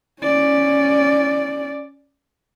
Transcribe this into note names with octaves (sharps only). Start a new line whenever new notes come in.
C#4 D5